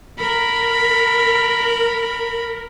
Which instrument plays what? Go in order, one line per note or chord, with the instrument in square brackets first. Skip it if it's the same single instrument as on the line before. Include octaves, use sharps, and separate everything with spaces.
[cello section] A#4 [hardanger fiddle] B5